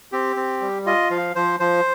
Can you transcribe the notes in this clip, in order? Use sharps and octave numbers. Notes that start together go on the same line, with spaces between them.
C4 G4
C4
G3
F4 D#5
F3 F5
F3 C5
F3 C5